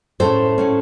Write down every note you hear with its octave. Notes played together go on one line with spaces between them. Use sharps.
A2 A3 C#4 A4 C5
A2 A3 C#4